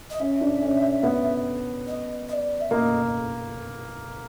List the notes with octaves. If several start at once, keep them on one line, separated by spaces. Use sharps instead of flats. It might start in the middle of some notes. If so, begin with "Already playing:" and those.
D#5
C#4 E5
D4
C#4
B3
D#5
D#5
D5
E5
A#3 D#5